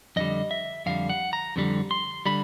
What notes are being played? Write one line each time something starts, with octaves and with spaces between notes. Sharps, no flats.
F2 D3 G3 D#5
E5
F2 D3 G3 F5
F#5
A#5
F2 D3 G3
C6
D3 G3 B5